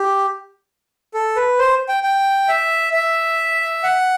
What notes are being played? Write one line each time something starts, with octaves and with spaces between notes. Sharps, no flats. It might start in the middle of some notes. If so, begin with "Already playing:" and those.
Already playing: G4
A4
B4
C5
G5
G5
E5
E5
F#5